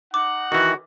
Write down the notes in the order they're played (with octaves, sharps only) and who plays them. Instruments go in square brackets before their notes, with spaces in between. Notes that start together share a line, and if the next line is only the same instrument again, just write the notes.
[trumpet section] D#4 F#5 [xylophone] D6
[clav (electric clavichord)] D#3 E3 [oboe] F#4